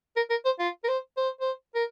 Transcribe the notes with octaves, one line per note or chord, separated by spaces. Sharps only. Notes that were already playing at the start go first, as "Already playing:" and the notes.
A#4
A#4
C5
F4
A#4
C5
C5
C5
A#4